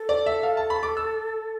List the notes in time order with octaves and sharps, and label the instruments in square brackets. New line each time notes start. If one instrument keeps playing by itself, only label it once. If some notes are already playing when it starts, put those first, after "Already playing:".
Already playing: [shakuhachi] A4
[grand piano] D5
E5
F5
A5
B5
D6
E6